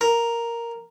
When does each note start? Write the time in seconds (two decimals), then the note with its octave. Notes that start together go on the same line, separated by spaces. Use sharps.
0.01 A#4